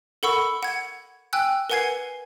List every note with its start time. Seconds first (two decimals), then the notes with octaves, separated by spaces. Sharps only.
0.23 A4 A#4 F#5 B5 C#6 E6
0.63 F#5 G#6
1.33 G5 G#5 E6 F#6
1.70 A#4 B4 F#5 G#5 G#6 C7